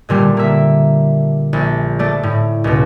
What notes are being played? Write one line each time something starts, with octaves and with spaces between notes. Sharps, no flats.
A#2 D3 G3 A3
A#3 E5
A#1
A3 D5
A2
C#2 B2